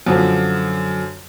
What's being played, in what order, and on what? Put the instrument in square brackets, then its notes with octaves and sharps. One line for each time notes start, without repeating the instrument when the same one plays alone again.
[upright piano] F#2 D3 F3